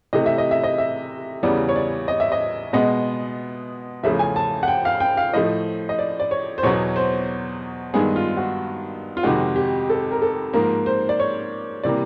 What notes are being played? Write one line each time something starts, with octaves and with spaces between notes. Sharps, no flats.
C3 E3 A3 D#5
E5
D#5
E5
D#5
E5
E2 C#3 E3 G3 B3 D5
C#5
D5
D#5
E5
D#5
B2 G#3 B3 D#5
E2 C#3 F3 A3 E5
G#5
A5
F#5
G5
F5
G5
F5
A2 F3 A3 D#5
D#5
D5
D5
C#5
C5
E2 B2 F#3 B3 C#5
C5
G2 D#3 G#3 B3 G#4
F4
F#4
F4
F2 C3 D#3 G#3 F#4
G4
A4
A#4
A4
G#2 F3 A#3 A#4
C5
D5
C#5
C3 E3 G3 A#3 D5